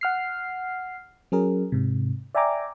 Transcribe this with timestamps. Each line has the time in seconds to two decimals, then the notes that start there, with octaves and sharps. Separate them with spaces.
0.01 F#5 F6 C7
1.32 F#3 C#4 G#4 A#4
1.72 G#2 C3
2.35 D5 E5 G5 G#5 A#5 D6